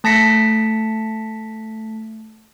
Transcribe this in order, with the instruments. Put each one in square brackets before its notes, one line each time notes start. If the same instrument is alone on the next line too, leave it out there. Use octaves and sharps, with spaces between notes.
[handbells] A3 A5 A#6 B6 C#7